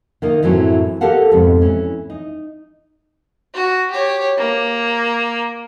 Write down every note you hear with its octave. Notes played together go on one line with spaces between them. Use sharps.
D#3 A#3 D#4
F#2 A2 E3 F#3 C4 C#4
G4 A4 A#4 F5 F#5 A5
F2 G#2 B2
E3 C#4
D#4
F#4
G4 C#5
A#3